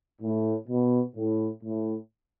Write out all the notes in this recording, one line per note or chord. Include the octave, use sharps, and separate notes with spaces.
A2
B2
A2
A2